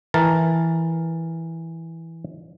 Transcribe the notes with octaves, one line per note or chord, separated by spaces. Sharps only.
E3 A#4 A5